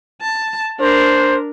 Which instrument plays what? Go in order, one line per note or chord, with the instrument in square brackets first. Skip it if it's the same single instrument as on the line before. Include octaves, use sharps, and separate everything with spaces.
[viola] A5
[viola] D4 A#4 [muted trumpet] C5